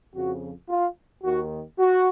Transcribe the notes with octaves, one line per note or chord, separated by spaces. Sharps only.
F2 C#3 F3 F#4
F4
D#2 D#3 F#4
F#4